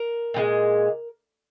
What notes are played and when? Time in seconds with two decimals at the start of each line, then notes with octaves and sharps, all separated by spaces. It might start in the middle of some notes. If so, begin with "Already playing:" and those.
Already playing: A#4
0.34 A#2 F3 G#3